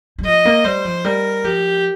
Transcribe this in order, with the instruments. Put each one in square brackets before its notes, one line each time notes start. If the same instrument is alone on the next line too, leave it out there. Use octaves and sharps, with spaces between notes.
[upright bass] G3
[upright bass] F3 [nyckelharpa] D#5
[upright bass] A#3
[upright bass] G3 [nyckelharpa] C5
[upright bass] F3
[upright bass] G3 [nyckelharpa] A#4
[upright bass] F3 [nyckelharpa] G4